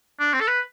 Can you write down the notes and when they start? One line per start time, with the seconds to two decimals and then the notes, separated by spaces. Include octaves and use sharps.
0.20 D4
0.34 C4
0.40 A4
0.48 B4